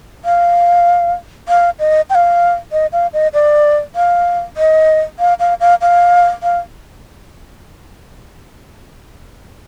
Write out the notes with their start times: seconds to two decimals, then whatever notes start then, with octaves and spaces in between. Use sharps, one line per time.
0.25 F5
1.48 F5
1.79 D#5
2.10 G5
2.15 F5
2.72 D#5
2.92 F5
3.13 D#5
3.34 D5
3.95 F5
4.57 D#5
5.19 F5
5.40 F5
5.60 F5
5.81 F5
6.43 F5